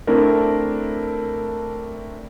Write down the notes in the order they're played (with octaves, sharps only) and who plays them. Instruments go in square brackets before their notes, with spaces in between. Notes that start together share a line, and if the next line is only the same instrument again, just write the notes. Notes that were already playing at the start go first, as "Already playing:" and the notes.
[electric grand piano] A3 C4 D4 E4 A#4